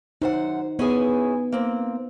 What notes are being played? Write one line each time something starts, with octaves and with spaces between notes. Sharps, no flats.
F#2 D#4 C5 F#5
B3 C#4 E4 G#4
A#3 C4